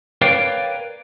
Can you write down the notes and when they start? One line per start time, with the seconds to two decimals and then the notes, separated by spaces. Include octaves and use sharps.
0.21 A#4 B4 C#5 D5 F5 G5